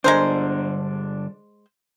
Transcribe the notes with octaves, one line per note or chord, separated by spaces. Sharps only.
G2 D3 G#3 D4 A#4 C5